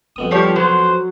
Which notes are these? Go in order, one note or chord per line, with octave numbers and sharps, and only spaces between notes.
F2 B3 D#6
F3 G3 G4 C#5
F#3 C5